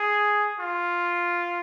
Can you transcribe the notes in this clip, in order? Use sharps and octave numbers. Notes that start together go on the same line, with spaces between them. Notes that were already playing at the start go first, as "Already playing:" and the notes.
Already playing: G#4
F4